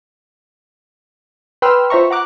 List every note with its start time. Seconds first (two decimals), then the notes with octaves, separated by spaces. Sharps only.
1.62 B4 G5 B5 C6 E6 F6
1.90 F4 C5 E5 A#5 C#6
2.11 F#5 A#5 D6 F#6